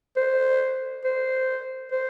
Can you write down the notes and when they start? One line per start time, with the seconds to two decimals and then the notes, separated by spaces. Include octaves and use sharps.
0.16 C5
1.04 C5
1.92 C5